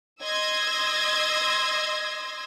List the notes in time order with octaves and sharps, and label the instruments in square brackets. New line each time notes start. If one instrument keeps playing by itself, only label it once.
[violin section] D#5 C6 E6 G#6 A#6